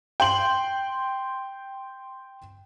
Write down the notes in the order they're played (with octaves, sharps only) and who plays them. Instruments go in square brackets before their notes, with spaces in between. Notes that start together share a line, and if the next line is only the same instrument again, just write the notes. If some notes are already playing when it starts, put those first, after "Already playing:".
[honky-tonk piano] G5 C6 F#7